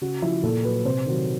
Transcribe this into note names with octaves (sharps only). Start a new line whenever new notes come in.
C#3 F#4
F3 E4
A#2 A4
F#3 B4
C3 C5
D#3 F#3